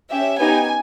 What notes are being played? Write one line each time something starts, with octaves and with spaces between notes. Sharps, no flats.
C#4 G4 E5
B3 D#4 G4 G#5